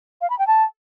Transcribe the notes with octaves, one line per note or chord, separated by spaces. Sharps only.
F5
B5
G5
A5